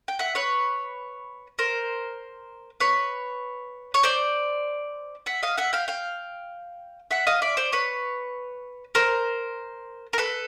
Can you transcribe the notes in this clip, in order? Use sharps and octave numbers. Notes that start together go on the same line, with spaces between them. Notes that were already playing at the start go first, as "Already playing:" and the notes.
G5
E5 F#5
B4 C#5
A#4 C5
B4 C#5
C#5
C5 D5
E5 F#5
D#5 F5
E5 F#5
F5 G5
F5 G5
E5 F#5
D#5 F5
D5 E5
C5 D5
B4 C#5
A#4 C5
A#4
A4 B4